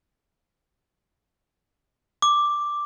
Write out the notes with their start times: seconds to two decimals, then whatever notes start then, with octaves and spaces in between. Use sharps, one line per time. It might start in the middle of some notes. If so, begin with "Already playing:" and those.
2.22 D6